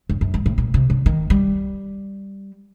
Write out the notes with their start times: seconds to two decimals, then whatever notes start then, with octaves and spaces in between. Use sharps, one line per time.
0.10 F#2
0.21 F#2
0.34 G2
0.46 A2
0.58 A#2
0.74 C3
0.90 D3
1.06 D#3
1.30 G3